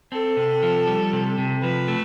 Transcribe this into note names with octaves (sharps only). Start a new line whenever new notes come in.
C4 A4
C3
F3
G3
C3
C3
F3 B4
A3